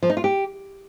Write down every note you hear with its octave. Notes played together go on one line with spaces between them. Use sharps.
F3
D#4
F4
G4